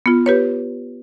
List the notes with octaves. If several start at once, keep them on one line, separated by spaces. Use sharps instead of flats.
B3 F4
G4 B4 C#5